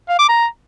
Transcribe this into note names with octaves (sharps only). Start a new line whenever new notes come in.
F5
D6
A#5